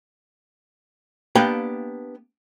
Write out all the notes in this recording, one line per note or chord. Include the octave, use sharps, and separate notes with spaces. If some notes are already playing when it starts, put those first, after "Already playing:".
A#3 B3 D4 G4 F5 G5